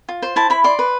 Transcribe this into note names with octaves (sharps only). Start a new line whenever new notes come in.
F4
C5
E4 A5
E4 B5
D5 C6
B4